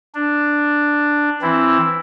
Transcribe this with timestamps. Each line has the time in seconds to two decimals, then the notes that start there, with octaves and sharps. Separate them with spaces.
0.15 D4
1.42 E3 C4 E4